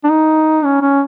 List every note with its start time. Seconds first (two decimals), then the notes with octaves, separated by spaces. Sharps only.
0.04 D4
0.10 D#4
0.65 C#4
0.82 C#4